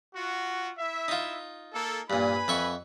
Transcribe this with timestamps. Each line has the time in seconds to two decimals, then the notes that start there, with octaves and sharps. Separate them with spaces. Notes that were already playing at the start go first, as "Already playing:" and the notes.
0.15 F4 F#4
0.78 E4 E5
1.08 D#4 F4
1.73 A#3 A4
2.10 G2 A#2 B4 G#5 B5
2.48 F2 E5 C#6